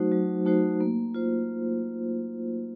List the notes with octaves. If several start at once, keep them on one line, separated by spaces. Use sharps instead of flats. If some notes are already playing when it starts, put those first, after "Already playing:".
Already playing: F#3 A3 D#4 F#4 C5
F#3
A3 D#4 F#4 C5
A#3
F4 C5